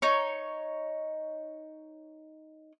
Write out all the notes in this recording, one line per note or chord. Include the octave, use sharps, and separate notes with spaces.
D#4 C#5